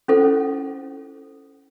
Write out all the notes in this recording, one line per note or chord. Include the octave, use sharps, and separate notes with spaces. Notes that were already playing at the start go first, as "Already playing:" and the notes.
C#4 E4 F4 A4 C5 F#5